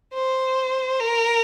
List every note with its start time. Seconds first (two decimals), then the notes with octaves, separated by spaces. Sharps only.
0.14 C5
1.00 A#4